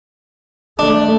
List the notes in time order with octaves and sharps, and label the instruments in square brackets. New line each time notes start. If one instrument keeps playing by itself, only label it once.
[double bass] A3 [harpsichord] D4